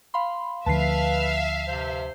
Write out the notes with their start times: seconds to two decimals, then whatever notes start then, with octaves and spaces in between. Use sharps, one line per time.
0.14 F5 B5 C6
0.66 D2 D3 F3 B4 E5 F5 A5 C7
1.67 G2 C3 C5